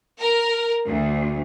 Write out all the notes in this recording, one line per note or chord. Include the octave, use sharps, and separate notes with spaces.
A#4
D2